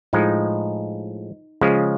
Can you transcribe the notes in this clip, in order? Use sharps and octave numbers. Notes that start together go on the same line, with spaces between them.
A2 F3 G#3 D#4
C#3 F3 G#3